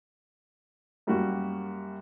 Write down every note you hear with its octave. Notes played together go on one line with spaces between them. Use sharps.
F#2 G3 A#3 F#4